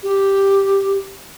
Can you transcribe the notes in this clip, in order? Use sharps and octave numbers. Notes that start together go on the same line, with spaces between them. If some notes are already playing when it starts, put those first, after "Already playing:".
G4